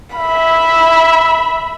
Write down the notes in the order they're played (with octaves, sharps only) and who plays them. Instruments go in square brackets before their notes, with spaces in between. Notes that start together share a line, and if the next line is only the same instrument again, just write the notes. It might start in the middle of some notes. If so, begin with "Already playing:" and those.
[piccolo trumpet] E5 [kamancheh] B5